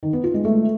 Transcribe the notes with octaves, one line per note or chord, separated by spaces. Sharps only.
D#3
B3
F4
G#3
A3